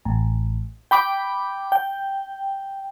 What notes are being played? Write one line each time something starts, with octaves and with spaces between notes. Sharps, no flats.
A1
G5 B5 D6
G5